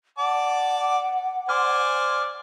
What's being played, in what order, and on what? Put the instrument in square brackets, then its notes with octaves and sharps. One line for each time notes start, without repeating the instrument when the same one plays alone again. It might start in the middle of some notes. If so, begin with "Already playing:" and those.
[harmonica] D5 A5 D6 [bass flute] F#5
[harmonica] C5 D5 G#5 [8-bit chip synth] D6 F6